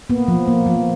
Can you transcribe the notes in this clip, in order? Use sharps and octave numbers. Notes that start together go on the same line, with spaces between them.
A#3 B3
F3
A#3
F3